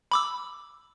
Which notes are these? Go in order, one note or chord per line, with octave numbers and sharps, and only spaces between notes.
B5 D6 E6